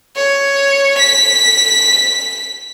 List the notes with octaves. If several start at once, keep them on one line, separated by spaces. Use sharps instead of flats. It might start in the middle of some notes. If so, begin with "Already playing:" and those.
C#5
B6